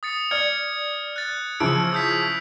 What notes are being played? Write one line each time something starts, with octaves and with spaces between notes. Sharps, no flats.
D#6 A6 C#7
D5 F6 G#6 C#7
F#6 A6
C#3 E3 F3 E6 C#7 D7
D#6 G6 B6